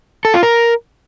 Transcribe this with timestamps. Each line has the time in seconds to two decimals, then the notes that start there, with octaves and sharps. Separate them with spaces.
0.25 A4
0.34 F4
0.43 A#4